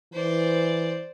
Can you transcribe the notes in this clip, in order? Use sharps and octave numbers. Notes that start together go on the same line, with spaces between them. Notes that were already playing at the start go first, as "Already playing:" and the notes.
E3 C5 D5